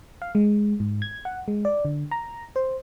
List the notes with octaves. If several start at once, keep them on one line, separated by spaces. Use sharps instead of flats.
F5
G#3
G#2
G#6
F#5
G#3
D5
D3
A#5
C5